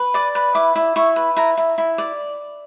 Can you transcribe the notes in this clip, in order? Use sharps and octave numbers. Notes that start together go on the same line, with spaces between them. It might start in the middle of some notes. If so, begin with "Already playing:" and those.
Already playing: B4
D5 D6
B4
E4 D6
E4
E4 C#6
B4
E4 A#5
E4
E4
D5